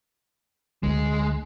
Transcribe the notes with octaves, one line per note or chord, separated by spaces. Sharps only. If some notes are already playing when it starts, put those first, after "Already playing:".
D2 G#3